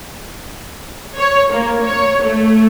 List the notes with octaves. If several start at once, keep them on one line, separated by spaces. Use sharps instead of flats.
C#5
A#3
C#5
A3